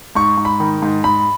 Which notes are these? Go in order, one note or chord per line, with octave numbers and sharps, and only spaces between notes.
G#2 C#6
G#2
B5
D#3
G#2
G#2 B5